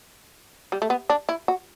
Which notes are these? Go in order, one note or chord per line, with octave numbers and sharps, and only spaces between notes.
G3
A3
B3
D4
E4
F#4